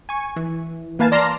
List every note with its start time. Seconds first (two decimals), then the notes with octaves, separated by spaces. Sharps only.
0.09 G#5 C#6
0.36 E3
0.99 E3 A#3 B4 F5 G#5 A5
1.12 D5 A5 A#5 C6 F6 A#6